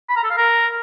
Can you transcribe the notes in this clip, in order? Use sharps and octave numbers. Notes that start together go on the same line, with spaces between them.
B5
A#5
A4
F5
A#4